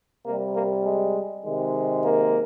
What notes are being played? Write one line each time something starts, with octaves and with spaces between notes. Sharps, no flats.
C3 G3 A#3
A#3
G#3
C3 D#3 G#3
A#3